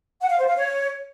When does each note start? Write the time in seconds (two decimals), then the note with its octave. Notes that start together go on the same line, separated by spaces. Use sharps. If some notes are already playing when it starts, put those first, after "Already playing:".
0.21 F#5
0.30 F5
0.38 C5
0.47 F5
0.56 C#5